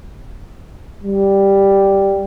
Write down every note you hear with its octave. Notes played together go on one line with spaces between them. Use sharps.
G3